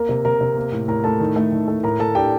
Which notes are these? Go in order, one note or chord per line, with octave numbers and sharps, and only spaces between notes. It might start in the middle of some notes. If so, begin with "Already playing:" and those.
Already playing: A#3 A#4 A#5
C3
C3 A#4 A#5
C3
A#3
A2
A2 A#4 A#5
A2 A4 A5
D#3
A3
D#3
A3
A2 A#4 A#5
A2 A4 A5
D4 G4 G5